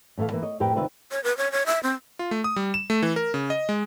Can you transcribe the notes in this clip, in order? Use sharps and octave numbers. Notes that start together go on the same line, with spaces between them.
A2 E3 A3 A4 F5
E3 A#3 B4
C#5 D#5
F2 A2 G4 A#4 B4 G5
D2 C3 D#3 F4 B4 E5
C#5
B4
C#5
C#5
E5
C4
F4
A3
D#6
G3
E7
A3
E3
A#4
C#3
D#5
G#3